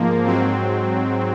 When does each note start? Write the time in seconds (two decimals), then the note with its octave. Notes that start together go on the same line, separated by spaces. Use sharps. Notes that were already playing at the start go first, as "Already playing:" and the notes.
Already playing: G#2 F3 A#3
0.25 G#2 F#3 C4